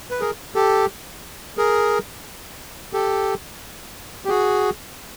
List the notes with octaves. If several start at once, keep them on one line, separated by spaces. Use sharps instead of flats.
B4
G#4 A#4
G4 A4
G#4 A#4
G4 A4
G4
F#4 G#4